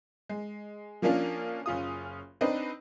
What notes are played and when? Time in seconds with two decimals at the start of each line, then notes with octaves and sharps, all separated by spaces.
0.29 G#3
1.02 F3 A#3 C#4 D4 F4
1.66 F#1 C#4 F4 D#6
2.41 C4 D4 D#4 B4